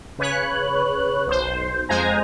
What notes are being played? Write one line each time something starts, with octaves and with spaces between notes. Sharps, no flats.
C#3 B4 C#5 F#6
B1 C5
F2 G#3 C5 G#5 A#5